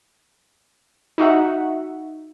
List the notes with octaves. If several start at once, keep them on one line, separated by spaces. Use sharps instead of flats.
D#4 F#4 E5 F#5